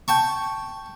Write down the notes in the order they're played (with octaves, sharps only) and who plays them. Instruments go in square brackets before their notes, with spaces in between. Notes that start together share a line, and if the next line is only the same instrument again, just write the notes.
[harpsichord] G5 A5 C#6